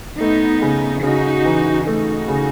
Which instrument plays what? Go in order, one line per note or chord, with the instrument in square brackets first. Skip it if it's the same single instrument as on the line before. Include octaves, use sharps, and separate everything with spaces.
[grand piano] A3 [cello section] B3 D#4
[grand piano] C#3
[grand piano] C#3 [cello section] D#4 F#4
[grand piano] E3
[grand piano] A3 [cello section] D#4 F#4
[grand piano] C#3